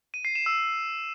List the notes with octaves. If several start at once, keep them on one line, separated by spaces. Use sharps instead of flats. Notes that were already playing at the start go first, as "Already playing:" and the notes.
D#7
C7
E7
E6